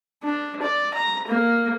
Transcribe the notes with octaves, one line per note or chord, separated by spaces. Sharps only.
D4
D5
A#5
A#3